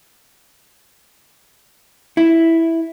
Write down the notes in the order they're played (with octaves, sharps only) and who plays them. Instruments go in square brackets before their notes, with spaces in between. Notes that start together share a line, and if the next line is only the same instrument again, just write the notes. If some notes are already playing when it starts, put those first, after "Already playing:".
[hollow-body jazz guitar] E4